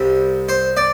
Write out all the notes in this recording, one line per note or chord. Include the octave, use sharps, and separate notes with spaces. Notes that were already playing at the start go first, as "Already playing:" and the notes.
Already playing: C2 C3 G3
C5
D5